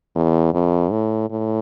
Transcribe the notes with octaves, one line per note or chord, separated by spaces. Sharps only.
E2
F2
A2
A2